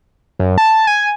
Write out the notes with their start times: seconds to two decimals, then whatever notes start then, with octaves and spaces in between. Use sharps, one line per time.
0.40 F#2
0.58 A5
0.87 G#5